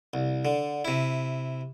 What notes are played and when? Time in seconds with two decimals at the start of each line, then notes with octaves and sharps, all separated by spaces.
0.14 C2
0.45 D3
0.85 C3 E4